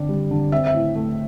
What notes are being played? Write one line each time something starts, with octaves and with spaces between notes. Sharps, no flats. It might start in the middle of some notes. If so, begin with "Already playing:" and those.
Already playing: D3 C4 D5
G3
D3
C4 E5
E5
A2
A3